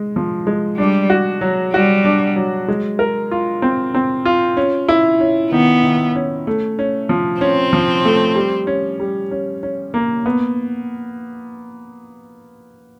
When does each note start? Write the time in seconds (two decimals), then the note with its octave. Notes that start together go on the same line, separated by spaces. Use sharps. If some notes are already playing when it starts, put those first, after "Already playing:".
Already playing: G#3
0.16 F3
0.47 G#3
0.78 G3 D4
1.10 F#4
1.41 F#3
1.74 G3 F#4
2.05 D4
2.36 F#3
2.68 G#3
2.99 A#4
3.31 F4
3.62 C4
3.95 C4
4.25 F4
4.57 C#4
4.89 E4
5.21 C#4
5.51 D#3 B3
5.84 D#3
6.16 C#4
6.47 A3
6.79 C#4
7.09 F3
7.41 C4 C#4
7.73 F3
8.05 A3
8.35 G3
8.67 C#4
9.00 G3
9.31 C#4
9.63 C#4
9.94 A#3
10.26 B3